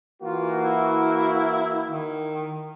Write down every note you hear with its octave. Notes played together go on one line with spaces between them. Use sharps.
E3 A#3 F4 F#4
E4
D#3